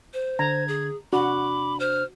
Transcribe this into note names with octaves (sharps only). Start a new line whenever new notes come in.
C5
D3 A#5 G#6
G#4
E2 C3 D4 F#4 B5 D6
C5 F6